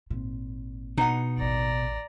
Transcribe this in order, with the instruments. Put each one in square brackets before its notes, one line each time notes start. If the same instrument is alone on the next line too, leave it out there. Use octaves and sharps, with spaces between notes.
[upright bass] G#1 A#2
[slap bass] B2 [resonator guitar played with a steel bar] D#4 F#5
[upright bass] A1 D#2 [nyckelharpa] D5 A#5